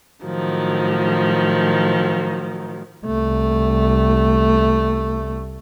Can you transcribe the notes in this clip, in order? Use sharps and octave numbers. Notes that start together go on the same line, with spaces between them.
A2 D#3 F3 F#3
C2 A3